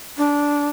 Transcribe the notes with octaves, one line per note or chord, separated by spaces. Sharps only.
D4